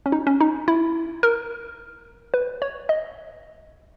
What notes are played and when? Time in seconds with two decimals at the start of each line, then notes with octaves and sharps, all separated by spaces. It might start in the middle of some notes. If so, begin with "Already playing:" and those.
0.06 C#4
0.12 D#4
0.27 C#4
0.40 D#4
0.68 E4
1.23 A#4
2.34 B4
2.62 C#5
2.89 D#5